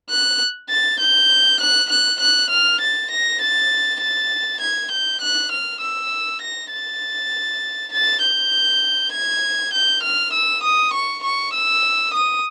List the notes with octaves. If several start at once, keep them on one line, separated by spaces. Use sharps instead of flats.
F#6
A6
G6
F#6
F#6
F#6
F6
A6
A#6
A6
A6
G#6
G6
F#6
F6
E6
A#6
A6
A6
G6
G#6
G6
F6
E6
D#6
C#6
C#6
E6
D#6